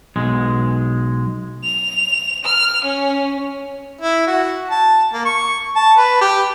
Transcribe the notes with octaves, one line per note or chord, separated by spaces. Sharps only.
B1 G#3
F7
F6
C#4
E4
F#4
A5
A#3
C#6
A5
B4
G4